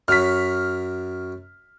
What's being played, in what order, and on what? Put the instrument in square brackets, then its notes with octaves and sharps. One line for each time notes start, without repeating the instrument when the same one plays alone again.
[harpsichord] F#2 F#3 [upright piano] F6 B6